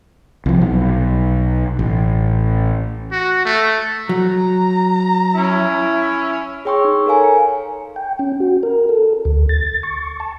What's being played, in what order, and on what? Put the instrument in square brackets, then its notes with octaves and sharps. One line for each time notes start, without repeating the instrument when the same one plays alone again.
[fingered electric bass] C2 F3
B1
A1
[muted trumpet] F#4
A3
[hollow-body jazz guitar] F#3 [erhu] A#5
[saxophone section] C#4 E4
[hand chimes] G#4 C#5 G5 C6 C#6 E6
D#4
A4 A#4 C#5 F5 G#5 A#5
C#7
[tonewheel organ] G5
C#4
F#4
A#4
A4
D2
A6
C#6
A5